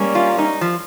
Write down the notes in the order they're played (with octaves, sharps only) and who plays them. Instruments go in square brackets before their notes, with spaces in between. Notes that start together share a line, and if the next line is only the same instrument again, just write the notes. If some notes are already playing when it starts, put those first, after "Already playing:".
Already playing: [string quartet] G3 A#3 C#4
[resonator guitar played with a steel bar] F4
D#4
F3